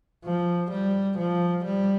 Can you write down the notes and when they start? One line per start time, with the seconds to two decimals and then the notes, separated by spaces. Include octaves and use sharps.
0.24 F3
0.70 G3
1.18 F3
1.64 G3